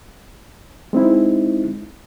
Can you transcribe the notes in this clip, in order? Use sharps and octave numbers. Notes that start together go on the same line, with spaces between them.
G#3 C4 D#4 E4